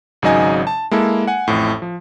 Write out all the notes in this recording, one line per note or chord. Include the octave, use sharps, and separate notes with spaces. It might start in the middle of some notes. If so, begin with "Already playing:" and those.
G#1 C#3 F#3 D#4 D#5 G#5
A5
G#3 A#3 E4 A4
F#5 G#5
A1 F2 A2
F3